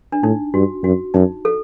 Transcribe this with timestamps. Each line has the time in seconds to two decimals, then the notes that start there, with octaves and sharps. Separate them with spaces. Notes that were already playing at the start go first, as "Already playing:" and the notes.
0.12 D4
0.23 A2 D#4
0.54 G2 F#4
0.84 F#2 F#4
1.14 F#2 D#4
1.45 A4